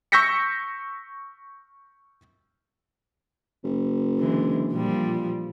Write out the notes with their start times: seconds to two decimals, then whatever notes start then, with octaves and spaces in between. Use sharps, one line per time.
0.12 C#6 E6 G6 A#6 B6 C#7
3.64 F#1
4.17 D3 E3 G#3
4.72 A#2 F3 G3